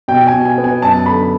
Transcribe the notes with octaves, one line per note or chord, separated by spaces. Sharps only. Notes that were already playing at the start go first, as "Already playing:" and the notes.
B2 G5
G#5
B2
G#5
B3
G#5
F#2 A5
D3 B5